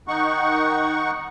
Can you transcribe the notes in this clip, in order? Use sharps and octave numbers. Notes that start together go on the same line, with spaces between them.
D#3 D#4 F#5 C#6